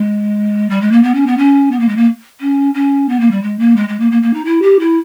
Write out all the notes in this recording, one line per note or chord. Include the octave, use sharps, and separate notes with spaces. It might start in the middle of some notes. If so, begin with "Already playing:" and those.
Already playing: G#3
G3
G#3
A#3
B3
C#4
B3
C#4
B3
A#3
G#3
A#3
C#4
C#4
B3
A#3
G3
G#3
A#3
G#3
G#3
A#3
A#3
A#3
D#4
E4
G4
E4